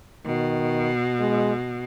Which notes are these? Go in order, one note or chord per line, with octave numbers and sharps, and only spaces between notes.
B2 D#3
G#3